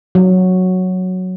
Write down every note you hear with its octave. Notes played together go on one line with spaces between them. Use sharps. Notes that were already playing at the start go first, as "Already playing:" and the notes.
F#3